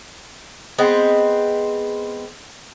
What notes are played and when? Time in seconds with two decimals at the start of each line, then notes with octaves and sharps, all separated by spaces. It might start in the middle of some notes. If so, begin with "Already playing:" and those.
0.78 G#3 B3 C4